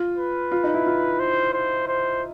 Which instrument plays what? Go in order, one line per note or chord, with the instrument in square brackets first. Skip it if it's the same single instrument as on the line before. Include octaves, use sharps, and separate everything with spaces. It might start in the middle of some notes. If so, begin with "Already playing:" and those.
Already playing: [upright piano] F4
[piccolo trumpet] B4
[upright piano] F4
D#4
E4
F4
[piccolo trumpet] C5
C5
C5